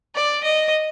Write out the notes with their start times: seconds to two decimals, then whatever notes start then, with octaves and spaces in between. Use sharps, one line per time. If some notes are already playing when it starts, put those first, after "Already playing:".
0.15 D5
0.43 D#5